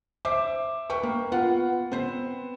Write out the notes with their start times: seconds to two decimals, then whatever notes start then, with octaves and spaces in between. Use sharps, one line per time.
0.25 C5 E5 D6
0.90 B4 G5 C#6
1.03 A#3
1.32 B3 F4 F#5
1.92 B3 C4 B4 C5